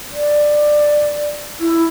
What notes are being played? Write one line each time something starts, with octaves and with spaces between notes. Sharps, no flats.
D5
E4